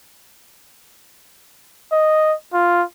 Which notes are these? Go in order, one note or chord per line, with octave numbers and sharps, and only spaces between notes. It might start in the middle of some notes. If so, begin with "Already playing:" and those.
D#5
F4